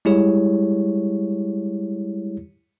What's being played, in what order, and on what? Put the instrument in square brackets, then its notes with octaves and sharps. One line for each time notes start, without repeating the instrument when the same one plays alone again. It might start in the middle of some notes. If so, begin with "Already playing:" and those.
[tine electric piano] G3 G#3 E4 G4 G#4 C#5